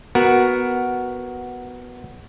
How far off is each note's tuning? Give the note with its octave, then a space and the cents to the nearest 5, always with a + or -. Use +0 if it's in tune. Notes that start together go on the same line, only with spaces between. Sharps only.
B3 +0 F#4 +0 A#4 +10